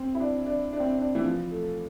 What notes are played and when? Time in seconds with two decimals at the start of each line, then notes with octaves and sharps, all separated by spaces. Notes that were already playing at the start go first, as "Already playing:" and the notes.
Already playing: C4
0.15 E4
0.20 D4
0.46 D4
0.73 D4
0.80 C4
0.87 D4
0.98 D4
1.15 E3
1.24 F3
1.51 A3